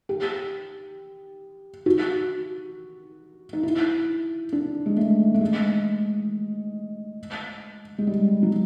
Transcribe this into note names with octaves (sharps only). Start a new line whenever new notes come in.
G4
F#4
D#4
E4
D4
G#3
A3
A3
G#3
G#3
G3
F#3